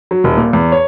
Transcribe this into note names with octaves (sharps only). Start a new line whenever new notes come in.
F#3
D#1
A#2
E2
C#5